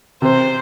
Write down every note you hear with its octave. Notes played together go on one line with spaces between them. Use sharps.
C3 C5